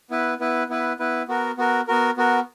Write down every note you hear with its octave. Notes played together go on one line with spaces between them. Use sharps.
B3 E4 B4
B3 E4 B4
B3 E4 B4
B3 E4 B4
B3 F#4 A#4
B3 F#4 A#4
B3 F#4 A#4
B3 F#4 A#4